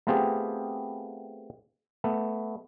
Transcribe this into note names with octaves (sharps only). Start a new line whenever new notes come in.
A3 B3 C4 F4 G4 G#4
A3 B3